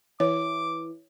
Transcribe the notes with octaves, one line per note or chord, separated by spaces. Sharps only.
E3 C#5 D6